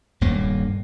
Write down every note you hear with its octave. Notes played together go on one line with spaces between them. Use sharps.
D#1 G2 A#3